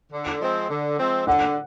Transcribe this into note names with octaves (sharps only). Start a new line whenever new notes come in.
D3
F3 G#3 C4
D3
F3 G#3 C4
D3 F#5